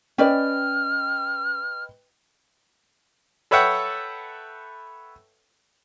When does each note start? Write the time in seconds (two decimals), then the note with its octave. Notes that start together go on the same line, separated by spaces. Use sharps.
0.18 C#4 B4 D5 D#5 G5 F6
3.51 A4 B4 C#5 E5 F#5 G5